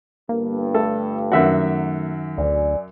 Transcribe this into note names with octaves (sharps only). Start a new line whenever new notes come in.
G1 G2 A#3
A3 A4
F#2 D#3 F#4 E5 F#5
D2 D5 G#5